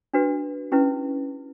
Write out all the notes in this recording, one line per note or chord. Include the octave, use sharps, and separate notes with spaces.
D4 F#4 B4
C#4 E4 G4 B4